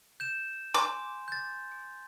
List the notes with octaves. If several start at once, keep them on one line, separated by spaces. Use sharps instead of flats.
G6 E7
G#5 C6 D6
G6 A6